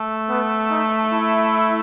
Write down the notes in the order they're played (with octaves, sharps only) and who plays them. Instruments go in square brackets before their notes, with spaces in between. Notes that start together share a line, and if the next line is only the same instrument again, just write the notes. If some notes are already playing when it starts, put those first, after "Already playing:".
Already playing: [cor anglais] A3
[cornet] B3
D#4
E4